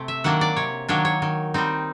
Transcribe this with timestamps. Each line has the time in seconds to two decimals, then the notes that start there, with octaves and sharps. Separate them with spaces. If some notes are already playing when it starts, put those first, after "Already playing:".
Already playing: C3 A3 C4
0.08 E5
0.24 D#3 F#3 A#3 D4 F#5
0.41 D5
0.56 C3 C#5
0.88 D#3 F#3 A#3 D4 C#5
1.05 C#5
1.22 D#3
1.54 G3 C4 D#4